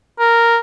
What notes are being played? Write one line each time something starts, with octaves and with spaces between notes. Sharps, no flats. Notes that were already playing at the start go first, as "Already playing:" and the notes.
A#4